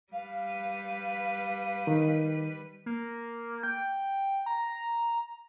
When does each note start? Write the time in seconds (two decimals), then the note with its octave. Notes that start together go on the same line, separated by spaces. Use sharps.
0.12 G3 B4 F5
1.87 D#3
2.86 A#3
3.63 G5
4.46 A#5